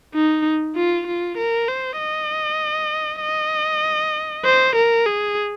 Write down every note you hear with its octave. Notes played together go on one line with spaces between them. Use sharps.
D#4
F4
F4
A#4
C5
D#5
D#5
C5
A#4
G#4